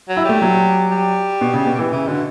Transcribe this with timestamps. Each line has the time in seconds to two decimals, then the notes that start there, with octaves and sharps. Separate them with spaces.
0.09 F#3
0.17 E4
0.25 G3 A3
0.42 F#3
0.91 G3
1.41 B2
1.54 C#3
1.66 B2
1.79 E3
1.92 C#3 E3
2.08 B2 D3